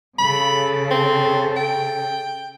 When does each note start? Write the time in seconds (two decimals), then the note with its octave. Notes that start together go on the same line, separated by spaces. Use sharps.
0.19 C#3 A4 B5
0.91 C4
1.56 G5